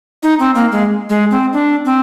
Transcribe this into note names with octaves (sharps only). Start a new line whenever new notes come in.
D#4
C4
A#3
G#3
G#3
C4
D4
C4